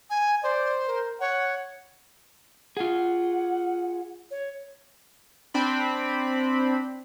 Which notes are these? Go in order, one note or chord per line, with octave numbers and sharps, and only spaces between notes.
G#5
C5 D5
A#4
C#5 F#5
F4 G#4 F#5
C#5
C4 D4 B5